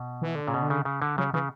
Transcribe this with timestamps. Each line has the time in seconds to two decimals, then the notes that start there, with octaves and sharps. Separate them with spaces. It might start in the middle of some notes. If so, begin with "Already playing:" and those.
Already playing: B2
0.22 E3
0.35 D3
0.48 A#2 C#3
0.54 B2
0.62 D3
0.70 C#3
0.85 C#3
1.02 D3
1.18 C#3 F#3
1.34 C#3 E3